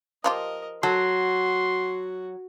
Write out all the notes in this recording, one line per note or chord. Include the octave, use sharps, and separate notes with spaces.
F3 F4 G4 A#4 D#5
F#3 F#4 A4 C6